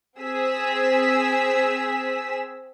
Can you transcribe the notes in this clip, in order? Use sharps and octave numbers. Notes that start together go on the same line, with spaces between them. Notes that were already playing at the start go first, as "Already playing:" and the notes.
C4 G#4 E6 B6